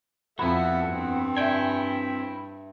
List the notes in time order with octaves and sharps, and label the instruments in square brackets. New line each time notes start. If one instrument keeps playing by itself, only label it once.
[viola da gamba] F2 [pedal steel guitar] B3 E4 F#4 [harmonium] A4 E5 [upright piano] B5
[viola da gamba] G2 [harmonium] C4
[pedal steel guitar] E4 G5 G#5 [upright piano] D5 E5